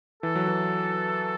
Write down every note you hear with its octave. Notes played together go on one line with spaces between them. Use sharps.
E3 A4
F#3
E3